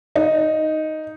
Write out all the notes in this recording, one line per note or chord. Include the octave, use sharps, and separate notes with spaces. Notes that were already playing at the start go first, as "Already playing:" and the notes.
D#4